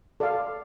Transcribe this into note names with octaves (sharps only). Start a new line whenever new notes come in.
A4 D5 F5